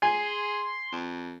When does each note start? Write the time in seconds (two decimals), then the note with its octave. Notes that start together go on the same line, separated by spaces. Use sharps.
0.02 G#4 G#5 C6
0.92 F2